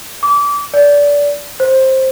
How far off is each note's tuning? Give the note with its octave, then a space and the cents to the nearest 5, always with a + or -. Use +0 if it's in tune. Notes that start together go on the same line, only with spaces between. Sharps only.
D6 -25
D5 -25
C5 +10